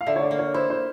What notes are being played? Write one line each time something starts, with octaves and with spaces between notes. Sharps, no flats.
F5
D3 E5
C#5
D5
A#3
C#5
E4 C5
C5